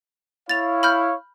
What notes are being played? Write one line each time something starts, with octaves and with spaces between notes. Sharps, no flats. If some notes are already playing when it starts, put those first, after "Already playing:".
E4 C#5 F5 A6 F7
B5 F6 G6